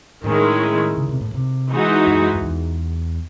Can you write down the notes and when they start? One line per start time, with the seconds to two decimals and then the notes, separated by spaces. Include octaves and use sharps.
0.24 A2 D#3 G#3 C#4 E4
0.97 C#3
1.09 C3
1.21 A2
1.34 C3
1.70 E3 G#3 D#4 F#4
2.07 F#2
2.35 F#2
2.43 E2